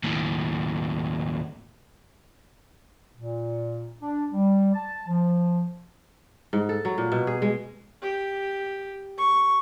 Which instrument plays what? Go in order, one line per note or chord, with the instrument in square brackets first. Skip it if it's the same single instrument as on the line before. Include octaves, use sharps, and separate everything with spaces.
[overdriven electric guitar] D#2 A2
[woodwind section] A#2
D4
G3
A5
F3
[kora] G#2
A4
F#3
A#2
B2
G#4
G#3
[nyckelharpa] G4
C#6